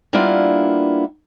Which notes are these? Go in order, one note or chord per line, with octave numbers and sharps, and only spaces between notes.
G3 A#3 B3 D4 E4 F4